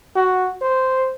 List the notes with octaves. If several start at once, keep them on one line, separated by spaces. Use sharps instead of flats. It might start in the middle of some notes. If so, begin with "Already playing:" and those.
F#4
C5